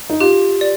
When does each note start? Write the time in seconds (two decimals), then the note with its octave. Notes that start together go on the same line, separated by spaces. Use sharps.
0.10 D#4
0.20 F4 G4
0.61 D5